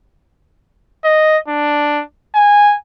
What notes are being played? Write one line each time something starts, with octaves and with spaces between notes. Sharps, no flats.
D#5
D4
G#5